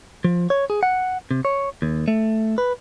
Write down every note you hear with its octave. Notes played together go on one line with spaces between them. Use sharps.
F3
C#5
G#4
F#5
C3
C#5
D#2
A3
B4